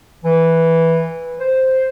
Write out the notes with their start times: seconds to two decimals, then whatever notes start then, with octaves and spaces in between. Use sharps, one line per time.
0.25 E3
1.40 C5